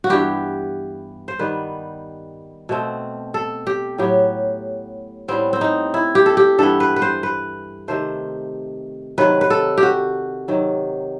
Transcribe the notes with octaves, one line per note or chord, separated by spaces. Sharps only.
F#4
G2 E3 B3 G4
C5
D#3 G3 B3 B4
B2 A3 C4
A4
G4
A2 F#3 B3 G4
A2 G3 B3 C4
C4
D#4
E4
G4
A4
G4
G2 E3 B3 A4
B4
B4
C5
B4
C3 D#3 A3 C5
C3 D#3 F#3 B4
B4
A4
G4
F#4
C3 D#3 F#3